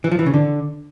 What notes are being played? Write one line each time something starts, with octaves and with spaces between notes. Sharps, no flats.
E3
F3
E3
C#3
D3